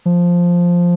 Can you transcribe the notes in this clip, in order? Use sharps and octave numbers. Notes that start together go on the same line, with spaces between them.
F3